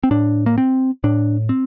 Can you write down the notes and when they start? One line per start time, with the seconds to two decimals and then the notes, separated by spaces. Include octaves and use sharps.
0.04 C4
0.11 A2 D4
0.46 A#3
0.58 C4
1.04 A2 D4
1.49 C4